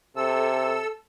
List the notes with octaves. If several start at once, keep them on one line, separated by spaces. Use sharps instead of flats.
C3 A4 E6